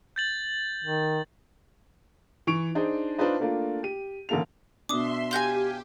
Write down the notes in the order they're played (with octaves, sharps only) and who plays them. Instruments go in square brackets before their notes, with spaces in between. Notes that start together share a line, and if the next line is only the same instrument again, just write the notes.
[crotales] G6 A6 F#7
[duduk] D#3
[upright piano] E3 C#6 D7 F7
D4 D#4 G#4 C5
D4 D#4 F4 B4 C5 D#5
A3 A#3 D4 F4
G4 D#7
A1 D3 A#3 A4 F7
[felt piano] B2 D4 [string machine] E5 C6 [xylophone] D6 D#6
[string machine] G4 [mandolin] F5 F#5 G#5 [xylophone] C6 G6 A#6